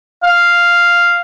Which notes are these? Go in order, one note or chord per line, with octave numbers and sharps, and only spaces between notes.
F5